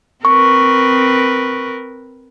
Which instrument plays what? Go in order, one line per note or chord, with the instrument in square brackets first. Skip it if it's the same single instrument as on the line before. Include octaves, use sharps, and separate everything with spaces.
[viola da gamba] C4 A#4 B4 [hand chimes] C#6